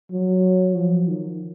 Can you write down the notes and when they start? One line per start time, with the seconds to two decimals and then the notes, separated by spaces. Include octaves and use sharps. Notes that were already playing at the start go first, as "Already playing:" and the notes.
0.12 F#3
0.76 F3
1.08 D#3